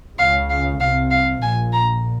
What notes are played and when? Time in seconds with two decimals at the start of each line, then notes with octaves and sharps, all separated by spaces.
0.18 C#2 C#3 F5
0.50 F5
0.80 C2 C3 F5
1.11 F5
1.42 A#1 A#2 G#5
1.73 A#5